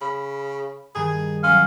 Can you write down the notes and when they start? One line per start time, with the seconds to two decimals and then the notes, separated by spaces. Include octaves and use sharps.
0.01 C#3 B5
0.95 G2 D#3 G#4
1.44 F#3 C#4 F5 C6